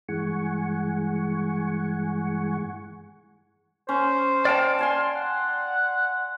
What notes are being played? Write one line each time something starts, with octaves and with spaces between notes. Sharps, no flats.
G2 E3 G#3 F#5 G#5 C#6
C#4 C5
D5 F5 G5 A5
F5 G#5 C6
F#5